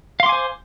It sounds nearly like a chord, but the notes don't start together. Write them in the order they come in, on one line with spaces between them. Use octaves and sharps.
F5 C6 D6 G#5 C5